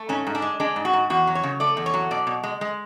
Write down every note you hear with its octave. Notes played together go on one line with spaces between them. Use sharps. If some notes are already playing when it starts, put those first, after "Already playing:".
Already playing: A3
G#2 C#4
G#2
D4
G#3
G#3 D4
G#2
F#4
G#2
E2 F#4
F#3
C#5
C#3
A3 D5
E2
C#5
F#3
B2 D5
B2
G#3
G#3